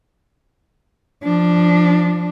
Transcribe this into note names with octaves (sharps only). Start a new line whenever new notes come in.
F3 D4